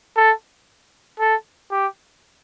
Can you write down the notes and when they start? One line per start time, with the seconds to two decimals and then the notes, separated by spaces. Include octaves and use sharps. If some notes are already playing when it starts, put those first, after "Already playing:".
0.16 A4
1.20 A4
1.71 G4